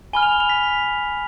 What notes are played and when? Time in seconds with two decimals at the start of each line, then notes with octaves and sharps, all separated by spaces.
0.13 G#5 B5 F6 G7
0.23 F7
0.32 G7
0.40 F7
0.49 B6